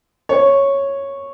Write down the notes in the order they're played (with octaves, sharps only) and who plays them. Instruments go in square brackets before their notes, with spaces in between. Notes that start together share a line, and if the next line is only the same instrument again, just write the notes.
[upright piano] C#5